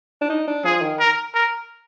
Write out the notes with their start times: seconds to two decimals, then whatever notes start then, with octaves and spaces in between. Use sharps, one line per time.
0.22 D4
0.30 D#4
0.48 D4
0.65 F3 G#4
0.82 D#3
1.00 A#4
1.34 A#4